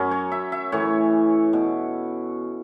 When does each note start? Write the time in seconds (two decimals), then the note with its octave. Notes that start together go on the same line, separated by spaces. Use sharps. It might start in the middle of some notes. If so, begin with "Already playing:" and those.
Already playing: F#2 F#3 C#4
0.11 C#5
0.32 E5
0.52 E5
0.72 A2 E3 C#5
1.53 B2